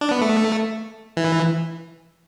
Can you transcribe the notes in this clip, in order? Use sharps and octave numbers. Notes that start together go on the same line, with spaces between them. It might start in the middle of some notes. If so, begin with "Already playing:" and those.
D4
B3
A3
E3